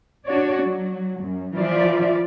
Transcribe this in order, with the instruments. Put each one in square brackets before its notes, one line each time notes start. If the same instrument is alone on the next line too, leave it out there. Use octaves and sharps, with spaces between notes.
[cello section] D4 F#4 C#5 D5
F#3
F#2
E3 F3 F4 D5 E5